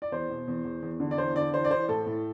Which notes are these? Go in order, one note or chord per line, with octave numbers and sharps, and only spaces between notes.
D5
E2 C5
B2
E2
E2
E2
D3
D5
E2 C5
D3 D5
E3 C5
D5
E3 C5
A2 A4
A2